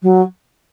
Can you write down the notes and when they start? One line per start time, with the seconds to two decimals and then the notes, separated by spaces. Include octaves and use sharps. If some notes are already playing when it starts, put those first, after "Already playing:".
0.03 F#3